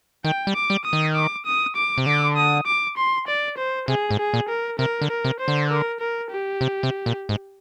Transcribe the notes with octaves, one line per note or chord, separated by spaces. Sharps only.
D#3 G5
G3
D6
G3
D#6
D#3
D6
D#6
D6
C3
D3 D6
D#6
D6
C6
D5
C5
C3 G#4
G#2
G#4
A#2
A#4
C3 A#4
D3
A#4
C3
C5
D3
A#4
A#4
G4
C3
C3
A#2
G#2